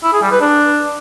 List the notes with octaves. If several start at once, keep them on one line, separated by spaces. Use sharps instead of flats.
E4
G#4
G3
B4
D4